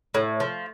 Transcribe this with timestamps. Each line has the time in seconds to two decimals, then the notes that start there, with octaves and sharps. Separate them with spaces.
0.14 A2
0.40 F3